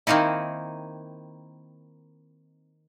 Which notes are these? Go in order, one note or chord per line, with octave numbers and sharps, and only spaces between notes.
D#3 A#3 C4 D#4 E4